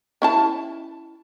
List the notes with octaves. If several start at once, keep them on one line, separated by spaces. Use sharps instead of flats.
C#4 E4 A5